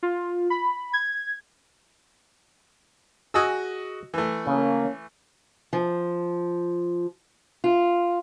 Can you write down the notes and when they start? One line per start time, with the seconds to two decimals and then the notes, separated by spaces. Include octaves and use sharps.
0.03 F4
0.50 B5
0.93 G#6
3.34 F#4 G#4 D#5 E6
4.14 E3 A3
4.47 C#3 A#3 C#4
5.73 F3
7.64 F4